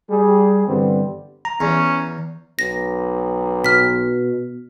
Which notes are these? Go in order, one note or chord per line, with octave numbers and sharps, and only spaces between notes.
G3 G#4
G2 D3 E3 G3 B3 C4
A#5
E2 C#4
B1 A#6
B2 F6 B6